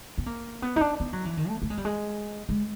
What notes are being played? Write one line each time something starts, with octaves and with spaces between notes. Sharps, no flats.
B3
A#3
B3
D#4
D4
B3
F#3
E3
D#3
A3
A3
G#3
G3
G#3
G#3